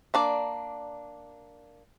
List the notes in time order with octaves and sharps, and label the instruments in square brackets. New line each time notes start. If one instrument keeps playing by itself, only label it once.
[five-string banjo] A#3 D4 D5